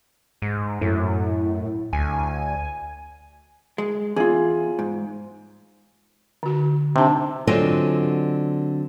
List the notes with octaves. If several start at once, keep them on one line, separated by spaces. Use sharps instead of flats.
G#2
F#2 A2
D2 G#5
G#3
E2 F4 G#4
G#2
D3 F#4
C3 D4 D#4 A5
D3 F#3 C4 F4 D#5 G#5